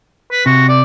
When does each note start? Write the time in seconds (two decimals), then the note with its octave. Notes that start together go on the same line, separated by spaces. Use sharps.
0.32 B4
0.46 C3 F#4
0.69 D5